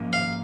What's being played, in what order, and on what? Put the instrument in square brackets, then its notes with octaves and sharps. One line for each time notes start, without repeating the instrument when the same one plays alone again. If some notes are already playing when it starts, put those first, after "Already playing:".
Already playing: [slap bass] G#2 F3 A#3 C#4
[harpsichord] F5